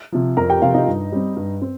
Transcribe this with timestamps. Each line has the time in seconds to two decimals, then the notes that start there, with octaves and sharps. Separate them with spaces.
0.12 C3 F3
0.37 F2 A#4 A#5
0.50 G4 G5
0.62 C3 F3 F4 F5
0.74 D#4 D#5
0.87 G2
1.12 G3 C4
1.36 G2
1.62 C4